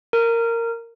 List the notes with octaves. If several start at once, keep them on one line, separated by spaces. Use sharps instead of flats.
A#4